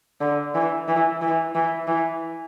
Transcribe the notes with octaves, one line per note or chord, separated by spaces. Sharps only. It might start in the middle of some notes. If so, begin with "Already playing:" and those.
D3
E3
E3
E3
E3
E3